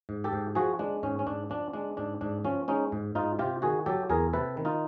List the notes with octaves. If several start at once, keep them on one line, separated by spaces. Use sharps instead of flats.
G#2
G4 A4
G#2
F3 F#4 G#4
G#3 D4
G#2 C#4
C#4
G#2 D4
F3 D4
G#3 D4
G#2 D4
G#2 D4
F3 C#4
G#3 C#4 D#4
G#2
G#2 D#4 F4
C3 F4 G4
D#3 F#4 G#4
F#3 G4 A4
E2 G#4 A#4
C3 A4 B4
D#3
D#4 F4